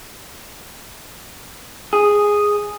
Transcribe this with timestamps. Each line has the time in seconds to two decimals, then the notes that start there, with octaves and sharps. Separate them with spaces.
1.93 G#4